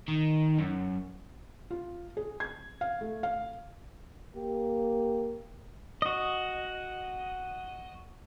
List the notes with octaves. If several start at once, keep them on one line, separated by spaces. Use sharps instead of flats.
D#3
F#2
F4
G#4
G#6
F5
A3
F5
A#3 G4
F#4 D#5